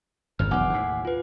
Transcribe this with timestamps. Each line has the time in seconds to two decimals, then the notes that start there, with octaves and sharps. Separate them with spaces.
0.39 G#1 F2 F6
0.51 E1 B1 F#5 G#5 D6
0.69 D#2 A2
1.05 F4 B4